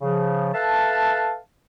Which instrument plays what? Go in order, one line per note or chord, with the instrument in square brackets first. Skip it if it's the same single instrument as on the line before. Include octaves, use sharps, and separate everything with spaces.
[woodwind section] C#3 F3
A4 B4 E5 F5 A5